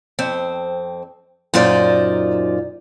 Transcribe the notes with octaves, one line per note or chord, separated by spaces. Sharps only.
F2 C4
F#2 A#2 D#4 F4 C5 D5